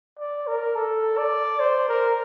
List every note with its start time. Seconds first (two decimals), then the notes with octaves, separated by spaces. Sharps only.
0.19 D5
0.47 A#4
0.76 A4
1.18 D5
1.60 C5
1.88 A#4